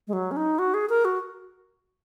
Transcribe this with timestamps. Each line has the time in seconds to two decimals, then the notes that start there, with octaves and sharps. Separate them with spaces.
0.08 G#3
0.13 F#3
0.31 C#4
0.37 D#4
0.59 F#4
0.74 G#4
0.89 A#4
1.05 F#4